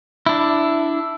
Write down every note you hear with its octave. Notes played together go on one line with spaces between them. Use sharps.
D4 E4